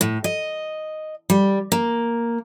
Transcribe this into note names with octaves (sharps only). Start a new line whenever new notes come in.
A2
D#5
G3
A#3